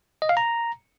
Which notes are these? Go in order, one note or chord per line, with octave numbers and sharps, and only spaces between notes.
D#5
F5
A#5